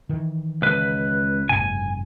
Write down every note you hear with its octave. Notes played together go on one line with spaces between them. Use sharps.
D#3 E3
C#2 B4
F#1 G#2 C3 G#5